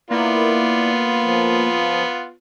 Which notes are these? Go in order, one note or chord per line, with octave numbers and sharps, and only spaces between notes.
A#3 B3 E4 F4 D5
F3